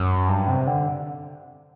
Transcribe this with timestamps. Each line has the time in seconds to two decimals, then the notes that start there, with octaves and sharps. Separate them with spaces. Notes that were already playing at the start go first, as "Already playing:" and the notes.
Already playing: F#2
0.29 G2
0.48 C3
0.67 D3